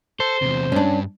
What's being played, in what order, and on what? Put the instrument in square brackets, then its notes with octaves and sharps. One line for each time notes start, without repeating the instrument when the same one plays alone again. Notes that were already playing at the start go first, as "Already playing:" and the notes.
[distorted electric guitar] A4 [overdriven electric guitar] C5
[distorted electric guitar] E2 C3
[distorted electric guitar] G2 [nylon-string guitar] C#4 D4